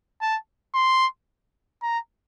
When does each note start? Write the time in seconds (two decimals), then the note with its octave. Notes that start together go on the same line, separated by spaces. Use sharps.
0.21 A5
0.74 C6
1.82 A#5